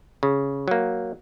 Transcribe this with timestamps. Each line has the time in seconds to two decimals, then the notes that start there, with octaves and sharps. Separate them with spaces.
0.23 C#3
0.68 F#3 A#3